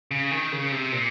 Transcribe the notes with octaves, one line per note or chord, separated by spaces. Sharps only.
C#3
D#3
C#3
C3
A#2